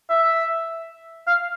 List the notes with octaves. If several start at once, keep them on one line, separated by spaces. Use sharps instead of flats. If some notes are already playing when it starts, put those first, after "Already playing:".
E5
F5